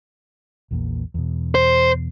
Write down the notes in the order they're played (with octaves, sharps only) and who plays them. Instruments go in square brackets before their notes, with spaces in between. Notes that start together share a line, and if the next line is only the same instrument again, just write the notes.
[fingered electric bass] A#1 E2 A#2
E2 B2
[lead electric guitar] C5